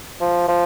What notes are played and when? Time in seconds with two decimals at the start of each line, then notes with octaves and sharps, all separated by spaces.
0.21 F3
0.48 F3